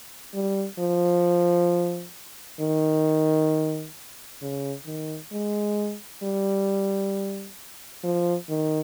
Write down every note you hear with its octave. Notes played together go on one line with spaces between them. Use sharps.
G3
F3
D#3
C#3
D#3
G#3
G3
F3
D#3